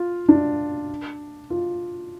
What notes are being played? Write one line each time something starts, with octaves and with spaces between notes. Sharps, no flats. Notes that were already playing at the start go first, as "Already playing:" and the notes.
Already playing: F4
D4
F4